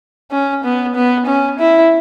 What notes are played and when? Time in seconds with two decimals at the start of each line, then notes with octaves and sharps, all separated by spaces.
0.31 C#4
0.64 B3
0.95 B3
1.26 C#4
1.59 E4